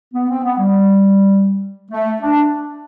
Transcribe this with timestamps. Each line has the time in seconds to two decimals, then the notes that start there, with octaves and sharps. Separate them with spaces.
0.14 B3
0.29 C4
0.44 B3
0.59 G3
1.91 A3
2.21 D4